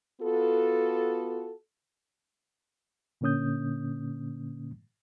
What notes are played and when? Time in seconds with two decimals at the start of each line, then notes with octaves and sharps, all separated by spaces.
0.21 B3 F4 F#4 A4
3.21 A#2 D3 A#3 C#4 D#6 G6